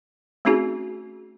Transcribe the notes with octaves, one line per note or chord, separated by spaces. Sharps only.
A3 C4 C#4 D#4 F#4 G#4